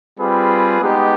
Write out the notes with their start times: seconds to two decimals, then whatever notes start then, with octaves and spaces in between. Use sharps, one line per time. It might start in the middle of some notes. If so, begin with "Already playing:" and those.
0.19 G3 C4 F4 G#4 B4
0.80 G#3 B3 D#4 G4 B4